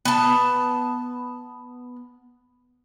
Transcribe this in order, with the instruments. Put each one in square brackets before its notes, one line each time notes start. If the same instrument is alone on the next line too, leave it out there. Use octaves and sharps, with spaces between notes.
[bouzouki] B3 A5